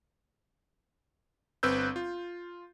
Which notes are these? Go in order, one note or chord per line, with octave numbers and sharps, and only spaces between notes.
G1 C4 B4 E6 G6
F4